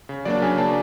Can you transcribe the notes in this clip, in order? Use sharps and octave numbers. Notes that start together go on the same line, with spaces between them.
C#3
F#3 A#3 D4 D5
C#3 G#5
F#3 A#3 D4 A5